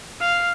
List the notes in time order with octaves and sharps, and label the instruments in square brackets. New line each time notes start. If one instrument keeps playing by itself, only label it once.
[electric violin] F5